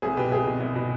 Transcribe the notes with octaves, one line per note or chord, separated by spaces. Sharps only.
C2 G#4
B2 G4 B4
C2 G#4
B2
C2
B2